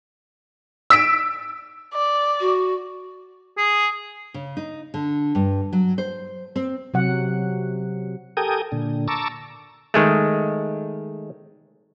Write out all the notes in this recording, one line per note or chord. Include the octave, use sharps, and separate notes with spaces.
E6 B6 D7
D5
F#4
G#4
C#3
D#4
D3
G2
F#3
C5
C4
C3 F#3 F#5
G4 A4 A#4 G5 G#5 D#6
A#2 D3
A5 A#5 C#6 D6 E6
D#3 G#3 A3